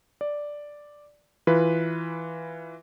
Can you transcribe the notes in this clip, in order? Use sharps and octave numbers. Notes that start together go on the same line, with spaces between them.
D5
E3 F4 B4